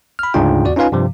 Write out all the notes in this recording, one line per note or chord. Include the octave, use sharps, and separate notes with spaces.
B5 F6
D2 G#2 C#3 D4 F4 G5
E2 F#4 D5
C#4 D#4 F4 B4 F5 G#5
G2 C3 F3